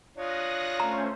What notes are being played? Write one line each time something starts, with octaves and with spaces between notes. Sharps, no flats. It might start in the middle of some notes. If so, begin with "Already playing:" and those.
D4 F4 C#5 D#6 F#6 A#6
A3 C#4 C5 A#5